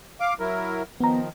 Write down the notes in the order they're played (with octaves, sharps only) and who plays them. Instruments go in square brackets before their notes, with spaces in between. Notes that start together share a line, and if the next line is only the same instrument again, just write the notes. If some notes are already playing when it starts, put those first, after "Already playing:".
[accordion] F5 D6
F#3 E4 A#4
[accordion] D#3 F3 [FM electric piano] B3 A#5